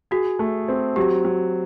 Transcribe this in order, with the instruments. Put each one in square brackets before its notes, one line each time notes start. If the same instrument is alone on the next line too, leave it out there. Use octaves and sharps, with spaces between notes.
[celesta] F#4 [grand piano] G#4
[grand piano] A3
C4
[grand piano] F#3 [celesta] G4
[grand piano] F#3